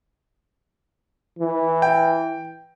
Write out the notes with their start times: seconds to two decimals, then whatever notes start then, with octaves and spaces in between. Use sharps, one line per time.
1.39 E3
1.82 G5